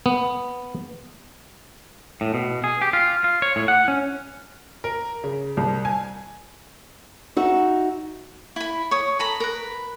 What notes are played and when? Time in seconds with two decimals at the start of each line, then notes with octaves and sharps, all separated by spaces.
0.06 B3
2.21 A2
2.34 B2
2.64 G#4
2.82 G4
2.93 F4
3.24 F4
3.42 C#5
3.56 A2
3.68 F#5
3.88 C#4
4.84 A#4
5.24 C#3
5.57 C2
5.85 G#5
7.37 D#4 F#4 E5
8.56 E4 B5
8.91 C#5 D#6
9.19 A4 A#5 B5
9.40 A#4 B4